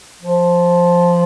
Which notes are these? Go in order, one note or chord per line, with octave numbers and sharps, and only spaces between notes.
F3